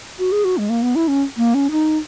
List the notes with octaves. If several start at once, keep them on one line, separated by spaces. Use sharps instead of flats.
F#4
G#4
F#4
G#3
A#3
B3
E4
C#4
A#3
C#4
D#4